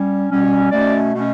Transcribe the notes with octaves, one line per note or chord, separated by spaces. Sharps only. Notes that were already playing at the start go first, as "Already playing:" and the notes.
Already playing: G3 C#4
B2 G3 C#4
B2 A3 C#4 D5
B2 A3 C#4